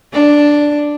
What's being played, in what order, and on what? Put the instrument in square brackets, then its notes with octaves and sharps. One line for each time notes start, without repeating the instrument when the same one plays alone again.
[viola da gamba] D4